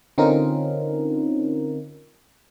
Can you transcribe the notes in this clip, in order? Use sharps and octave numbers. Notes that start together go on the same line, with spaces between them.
D3 C4 C#4 D#4 F4 A#4